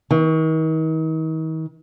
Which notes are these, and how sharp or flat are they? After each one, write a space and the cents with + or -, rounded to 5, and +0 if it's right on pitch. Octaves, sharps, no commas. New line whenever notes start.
D#3 +40